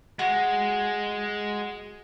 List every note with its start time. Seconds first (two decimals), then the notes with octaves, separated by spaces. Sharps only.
0.19 G#3 F#4